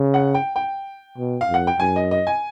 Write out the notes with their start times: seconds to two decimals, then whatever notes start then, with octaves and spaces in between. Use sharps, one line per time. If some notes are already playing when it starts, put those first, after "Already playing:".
Already playing: C#3
0.14 F#5
0.34 G5
0.56 G5
1.18 B2
1.41 F5
1.48 F2
1.54 F#5
1.67 G5
1.79 F#2 G#5
1.96 D#5
2.11 D#5
2.27 G#5